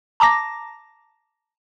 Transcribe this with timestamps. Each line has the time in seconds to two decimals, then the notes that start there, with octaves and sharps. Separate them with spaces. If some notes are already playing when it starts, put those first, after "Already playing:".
0.20 A5 A#5 D6 A#6